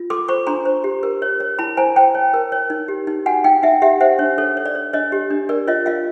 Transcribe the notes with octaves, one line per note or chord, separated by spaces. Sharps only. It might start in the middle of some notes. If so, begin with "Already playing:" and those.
Already playing: F4
A4 C6 D6
C5 B5 C#6
D4 A#5 C6
C5
G4
A#4
C#5
C#5
E4 A5 B5
C5 G#5 A#5
C5 G5 A5
C#5
A#4
C#5
D#4
G4
D#4
F#4 F#5 G#5
D#4 F5 G5
D#4 E5 F#5
G4 E5 F#5
C5 E5 F#5
D4 C#5
A4 C#5
C#5
D5
C#5
D4 C#5 D#5
G4
D4
A#4 D5
F4 C#5 D#5
F4 D#5 F5